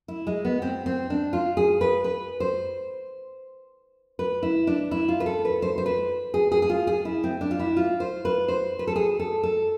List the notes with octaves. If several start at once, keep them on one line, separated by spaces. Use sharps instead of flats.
E4
G#3
B3
C4
C4
D4
F4
G#4
B4
B4
C5
B4
E4
D4
E4
F4
B4
A4
B4
C5
C5
B4
G#4
G#4
G#4
F4
G#4
E4
C4
D4
F4
E4
F4
C5
B4
C5
B4
A4
G#4
A4
A4